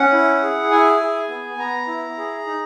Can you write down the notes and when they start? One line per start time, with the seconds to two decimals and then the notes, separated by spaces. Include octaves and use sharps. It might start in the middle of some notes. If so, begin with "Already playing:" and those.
Already playing: C#4 F#5
0.12 E4
0.42 G#4
0.71 E4 G#5
1.00 G#4
1.29 B3
1.58 B3 A#5
1.87 E4
2.17 G#4
2.46 D#4